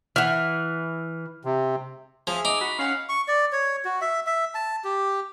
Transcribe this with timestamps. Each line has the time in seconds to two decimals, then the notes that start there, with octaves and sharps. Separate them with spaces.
0.16 E3 E5 F#5 F6
1.45 C3
2.27 F3 G#4 E5
2.45 D#4 D6
2.61 F#4 B5
2.79 C#4 F5 F#5
3.09 C#6
3.28 D5
3.52 C#5
3.85 F#4
4.01 E5
4.27 E5
4.55 A5
4.84 G4